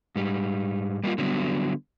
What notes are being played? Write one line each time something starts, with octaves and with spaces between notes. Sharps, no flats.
G#2 G3
G3 A#3 B3 F4
D3 F#3 G3 B3